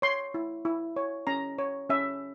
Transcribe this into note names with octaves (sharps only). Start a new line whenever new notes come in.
C#5 C6
E4
E4
C#5
C#4 A#5
C#5
C#4 E5